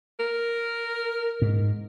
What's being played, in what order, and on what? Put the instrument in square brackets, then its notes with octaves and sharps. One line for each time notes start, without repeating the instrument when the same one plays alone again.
[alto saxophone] A#4
[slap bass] G#2